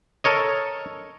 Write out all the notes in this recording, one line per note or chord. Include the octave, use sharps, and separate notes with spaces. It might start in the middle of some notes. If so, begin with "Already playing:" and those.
A4 A#4 C#5 D#5